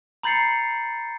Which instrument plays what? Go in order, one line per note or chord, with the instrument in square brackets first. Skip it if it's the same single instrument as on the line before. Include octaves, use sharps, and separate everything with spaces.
[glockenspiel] A#5 B5 G6 A6 C7 C#7